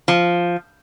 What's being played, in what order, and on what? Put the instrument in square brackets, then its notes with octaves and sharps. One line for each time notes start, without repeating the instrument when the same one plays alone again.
[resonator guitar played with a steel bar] F3